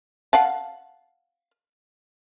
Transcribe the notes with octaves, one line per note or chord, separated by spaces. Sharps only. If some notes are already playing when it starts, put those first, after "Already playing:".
F5 F#5 A5